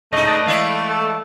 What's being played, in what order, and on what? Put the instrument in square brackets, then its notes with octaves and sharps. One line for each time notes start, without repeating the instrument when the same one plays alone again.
[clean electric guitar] C#2 A2 [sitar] G#3 D#4 [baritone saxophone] A3 [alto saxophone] D#5
[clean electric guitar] B4 D5 A5
[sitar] E3 E4 D5 [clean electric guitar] G#3 F5
[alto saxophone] A4